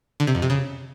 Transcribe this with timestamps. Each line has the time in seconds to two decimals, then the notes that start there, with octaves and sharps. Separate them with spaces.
0.20 D3
0.27 C3
0.35 F2
0.42 C3
0.50 C#3